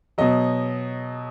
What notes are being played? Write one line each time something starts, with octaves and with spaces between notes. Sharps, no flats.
B2 F#3 D#5